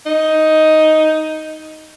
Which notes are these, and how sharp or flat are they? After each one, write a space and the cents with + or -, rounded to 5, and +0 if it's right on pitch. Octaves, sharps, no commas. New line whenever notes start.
D#4 +5